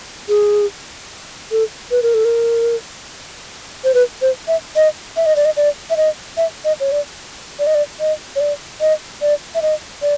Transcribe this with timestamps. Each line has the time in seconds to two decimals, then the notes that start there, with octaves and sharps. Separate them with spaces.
0.29 G#4
1.51 A4
1.91 B4
2.03 A#4
2.14 A4
2.25 A#4
3.84 C5
3.94 B4
4.22 C5
4.48 E5
4.76 D#5
5.17 E5
5.26 D#5
5.36 D5
5.45 D#5
5.57 D5
5.90 E5
5.97 D#5
6.37 E5
6.65 D#5
6.80 C#5
6.92 D5
7.59 D5
7.67 D#5
7.75 D5
8.00 D#5
8.36 C#5
8.41 D5
8.81 D#5
9.22 D5
9.55 E5
9.62 D#5
10.02 D5